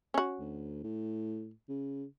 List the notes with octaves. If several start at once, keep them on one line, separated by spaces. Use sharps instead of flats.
C#4 F#4
D2
A2
C#3